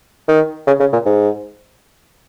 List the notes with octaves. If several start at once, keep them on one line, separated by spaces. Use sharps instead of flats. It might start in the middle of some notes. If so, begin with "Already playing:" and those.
D#3
C#3
C#3
A#2
G#2